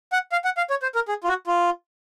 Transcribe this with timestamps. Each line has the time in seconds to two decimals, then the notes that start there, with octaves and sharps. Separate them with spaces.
0.12 F#5
0.32 F5
0.45 F#5
0.57 F5
0.70 C#5
0.82 C5
0.95 A#4
1.08 G#4
1.24 F4
1.28 F#4
1.47 F4